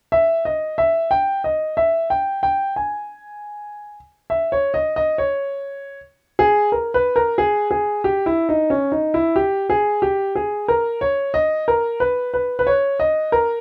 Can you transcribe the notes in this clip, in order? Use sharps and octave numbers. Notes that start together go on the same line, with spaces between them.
E5
D#5
E5
G5
D#5
E5
G5
G5
G#5
E5
C#5
D#5
D#5
C#5
G#4
A#4
B4
A#4
G#4
G#4
G4
E4
D#4
C#4
D#4
E4
G4
G#4
G4
G#4
A#4
C#5
D#5
A#4
B4
B4
B4
C#5
D#5
A#4